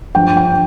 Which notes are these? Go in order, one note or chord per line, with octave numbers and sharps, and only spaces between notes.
G2 F3 G5
G5